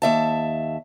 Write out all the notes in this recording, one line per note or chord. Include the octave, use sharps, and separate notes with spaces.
D#2 E5 A5